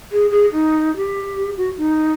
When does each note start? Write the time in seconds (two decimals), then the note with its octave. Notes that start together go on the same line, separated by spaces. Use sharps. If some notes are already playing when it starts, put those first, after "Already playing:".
0.12 G#4
0.31 G#4
0.53 D#4
0.97 G4
1.57 F#4
1.78 D#4